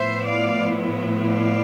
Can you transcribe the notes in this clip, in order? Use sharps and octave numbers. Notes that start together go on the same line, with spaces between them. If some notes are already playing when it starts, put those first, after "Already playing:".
Already playing: A2 F3 B3 E4 C5 E5
D5 F5
D5 F5